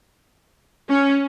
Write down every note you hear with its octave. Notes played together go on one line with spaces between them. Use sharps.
C#4